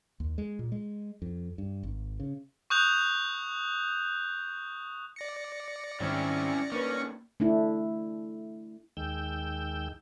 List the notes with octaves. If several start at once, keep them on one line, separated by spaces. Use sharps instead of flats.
D#2
G#3
A#2
G#3
F2
G2
G#1
C#3
C#6 D#6 F#6 G6 F7
D5 A#6 C#7
G#2 D#3 G3 C4 C#4 E4 C#5
C2 D#3 A#3 C#4 D4 B4
A3 D4 E4
D#2 D#3 G#3 G5 E6 G6